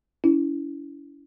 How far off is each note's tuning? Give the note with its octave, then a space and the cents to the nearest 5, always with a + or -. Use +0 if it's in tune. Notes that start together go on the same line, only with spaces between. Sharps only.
C#4 +40 E4 +0